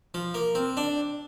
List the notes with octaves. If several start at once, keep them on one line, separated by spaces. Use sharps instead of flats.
F3
A#3
C4
D4